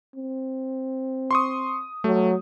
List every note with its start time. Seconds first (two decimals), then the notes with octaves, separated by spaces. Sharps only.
0.16 C4
1.31 C6 C#6 D#6
2.04 F#3 A3